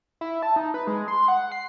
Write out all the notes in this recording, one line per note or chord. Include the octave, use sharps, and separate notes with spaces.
E4
A5
D#4
B4
G#3
C6
F#5
C7